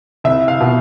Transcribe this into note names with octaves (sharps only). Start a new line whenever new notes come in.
C2 E5
F5
B2